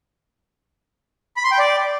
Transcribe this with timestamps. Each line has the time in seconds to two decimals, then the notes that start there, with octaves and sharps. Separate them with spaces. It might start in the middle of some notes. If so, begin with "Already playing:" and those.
1.37 B5
1.44 C6
1.51 G5
1.59 D5